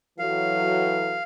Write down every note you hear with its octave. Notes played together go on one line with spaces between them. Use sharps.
E3 F#3 A4 F5